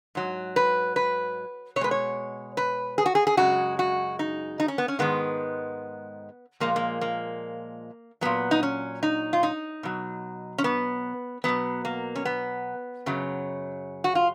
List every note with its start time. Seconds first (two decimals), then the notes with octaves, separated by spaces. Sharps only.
0.15 G#2 F#3
0.56 B4
0.96 B4
1.76 B2 C#5
1.81 G#3 B4
1.91 C#5
2.57 B4
2.98 G#4
3.06 F#4
3.15 G#4
3.27 G#4
3.37 F#2 C#3 G#3 F#4
3.79 F#4
4.19 D#4
4.60 D#4
4.68 C#4
4.78 B3
4.88 C#4
4.99 G#2 D#3 G#3 B3
6.60 A#2 F3 G#3 A#3
6.76 A#3
7.01 A#3
8.21 A#2 F#3 B3
8.51 D#4
8.63 C#4
9.03 D#4
9.33 F4
9.43 D#4
9.83 B2 F#3
10.58 C#4
10.64 B3
11.44 B2 F#3 B3
11.85 A#3
12.16 C#4
12.25 B3
13.06 F#2 C#3 F#3
14.04 F#4
14.15 F4